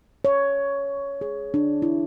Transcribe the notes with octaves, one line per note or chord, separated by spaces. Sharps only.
C#5
G#4
D4
E4